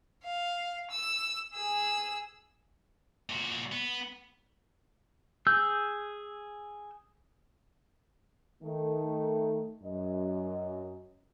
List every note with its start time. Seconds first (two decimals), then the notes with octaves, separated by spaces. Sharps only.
0.24 F5
0.90 E6
1.54 G#4 E6
3.29 A#2 F#4
3.72 B3
5.47 G#4 E6 G6
8.63 D#3 A3
9.83 F#2 D#5